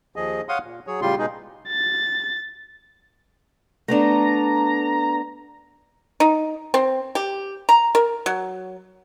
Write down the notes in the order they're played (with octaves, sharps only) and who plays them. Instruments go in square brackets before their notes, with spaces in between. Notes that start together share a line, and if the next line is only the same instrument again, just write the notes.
[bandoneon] D#2 F3 G#4 D#5
C#5 F5 F#5 C6 D#6
A#2
F#3 G#4 C#5
A2 C#3 G3 F4 G4 C6
B2 G#3 D#4 G#4
[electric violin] A6
[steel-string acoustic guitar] A3 B3 D4 [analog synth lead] A#5
[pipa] D#4
C4
G4
A#5
A#4
F#3